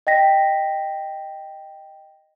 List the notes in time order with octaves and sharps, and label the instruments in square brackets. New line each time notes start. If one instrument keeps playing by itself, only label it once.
[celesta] D#5 G5 A#6 B6